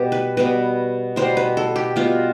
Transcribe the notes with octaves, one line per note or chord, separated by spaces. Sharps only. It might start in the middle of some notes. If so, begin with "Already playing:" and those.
Already playing: B2 G3 B3 G4
B4
B2 G3 B3 B4
B2 G3 B3 C5
B4
A4
G4
B2 G3 B3 F4